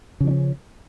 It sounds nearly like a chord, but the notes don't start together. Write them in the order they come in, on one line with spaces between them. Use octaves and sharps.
C#3 F3 D4 C#4